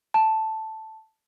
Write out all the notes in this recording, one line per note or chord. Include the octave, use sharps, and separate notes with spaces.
A5